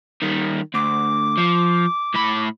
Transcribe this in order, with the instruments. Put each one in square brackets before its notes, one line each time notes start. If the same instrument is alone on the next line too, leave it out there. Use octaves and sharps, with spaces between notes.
[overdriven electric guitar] D#3 G3
[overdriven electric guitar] D2 [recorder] D6
[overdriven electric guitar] F3
A2 B5